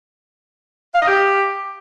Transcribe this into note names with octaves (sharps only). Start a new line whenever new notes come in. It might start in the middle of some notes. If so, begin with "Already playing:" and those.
F5
D#5
G4